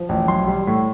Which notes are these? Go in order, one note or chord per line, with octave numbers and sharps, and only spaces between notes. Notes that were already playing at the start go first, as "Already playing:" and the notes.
Already playing: F3
A1
B1 C6
G3
A2